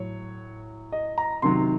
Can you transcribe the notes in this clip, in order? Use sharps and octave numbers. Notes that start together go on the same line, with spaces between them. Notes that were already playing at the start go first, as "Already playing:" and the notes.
Already playing: A2 F#3 C#5
D#5
A#5
C3 D#3 F#3 C6